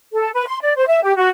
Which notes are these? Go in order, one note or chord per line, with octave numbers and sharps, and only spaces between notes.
A4
B4
C6
D5
C5
E5
G4
F#4